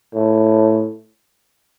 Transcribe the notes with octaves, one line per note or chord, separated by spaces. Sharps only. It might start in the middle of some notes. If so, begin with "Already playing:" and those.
A2